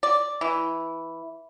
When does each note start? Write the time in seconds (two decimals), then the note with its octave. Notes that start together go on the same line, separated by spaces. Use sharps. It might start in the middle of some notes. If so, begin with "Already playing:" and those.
0.03 D5
0.41 E3